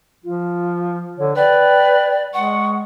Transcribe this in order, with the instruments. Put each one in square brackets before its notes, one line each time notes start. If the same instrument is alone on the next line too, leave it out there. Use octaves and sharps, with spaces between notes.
[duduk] F3 [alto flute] F4
[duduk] D3 [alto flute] C#5
[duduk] B4 [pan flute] D5 [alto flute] G5
[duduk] G#3 [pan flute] F#5 [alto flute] C#6